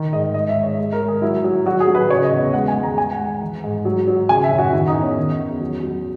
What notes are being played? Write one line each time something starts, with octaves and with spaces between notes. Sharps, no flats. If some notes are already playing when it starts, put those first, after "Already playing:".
Already playing: D#3
G#2 D#5
G#3 D#5
E5
G#3
C#5
G#3
A#4
G#3
G#4
F#3 E4
F#3
F#3 F#4
G#4
F#3
B4
C#3 C#5
D#5
E2
G#3 F#5
G#5
G#3
A#5
G#3 G#5
F#5
G#3
E3
G#2
F#3
F#3
C#3 G#5
E5
F#2
F#4
D#3 E4
D#4
E2
C#4
D#3
E2
F#3
F#3